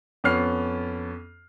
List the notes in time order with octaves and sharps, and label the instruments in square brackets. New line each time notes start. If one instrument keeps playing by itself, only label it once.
[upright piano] F2 B3 C#4 F6 C7